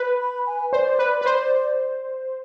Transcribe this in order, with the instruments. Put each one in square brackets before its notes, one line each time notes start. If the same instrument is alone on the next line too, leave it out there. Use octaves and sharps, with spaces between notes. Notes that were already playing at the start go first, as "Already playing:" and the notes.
Already playing: [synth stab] B4
[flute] B5
G#5
[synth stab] C5 [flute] D5
[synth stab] B4
B4
C5